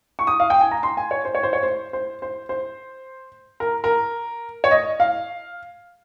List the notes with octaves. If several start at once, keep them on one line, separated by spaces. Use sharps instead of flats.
C#6
D#6
F5
G5
G#5
A#5
C6
G#5
C#5
C5
C#5
C5
C#5
C5
C5
C5
C5
A#4
A#4
C#5
D#5
F5